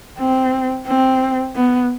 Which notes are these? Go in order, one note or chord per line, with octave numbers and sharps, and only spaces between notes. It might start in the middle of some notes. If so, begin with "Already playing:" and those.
C4
C4
B3